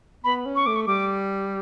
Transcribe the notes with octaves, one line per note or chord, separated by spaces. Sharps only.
B3 B5
C#4
C#6
A3 D6
C#6
G3 D6